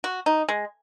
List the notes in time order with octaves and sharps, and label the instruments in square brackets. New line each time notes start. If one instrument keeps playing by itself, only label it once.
[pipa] F#4
D#4
G#3